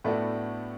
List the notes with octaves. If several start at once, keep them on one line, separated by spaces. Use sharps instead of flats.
A2 A3 B3 D4 F#4